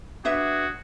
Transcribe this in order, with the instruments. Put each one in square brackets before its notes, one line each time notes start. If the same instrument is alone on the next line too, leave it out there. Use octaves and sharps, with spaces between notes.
[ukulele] D4 B4 E5 [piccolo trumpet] F#4 [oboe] G#4